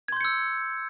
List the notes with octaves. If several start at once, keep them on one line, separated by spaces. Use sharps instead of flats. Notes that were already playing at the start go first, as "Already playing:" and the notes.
C6 E6 G6 G#6 C#7